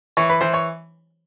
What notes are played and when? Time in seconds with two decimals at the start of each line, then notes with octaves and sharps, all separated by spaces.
0.17 E3 C#5
0.30 B4
0.41 E3 C5
0.54 C#5